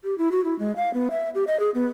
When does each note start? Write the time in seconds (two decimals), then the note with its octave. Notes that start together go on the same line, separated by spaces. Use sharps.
0.04 G4
0.18 E4
0.31 F#4
0.45 E4
0.59 G#3
0.76 F5
0.94 B3
1.11 E5
1.35 G4
1.47 D#5
1.60 G#4
1.74 B3